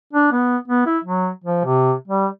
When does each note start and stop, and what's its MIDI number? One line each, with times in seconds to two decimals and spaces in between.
0.13 0.30 62
0.32 0.57 59
0.68 0.86 59
0.86 0.98 64
1.04 1.29 54
1.44 1.63 53
1.64 1.92 48
2.07 2.27 55